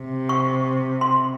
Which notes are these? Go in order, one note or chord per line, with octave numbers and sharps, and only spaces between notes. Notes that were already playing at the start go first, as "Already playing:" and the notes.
Already playing: C3
C#6
C6